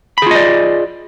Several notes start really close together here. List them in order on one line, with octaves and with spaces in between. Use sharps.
B5 G#4 F4 D#5 D5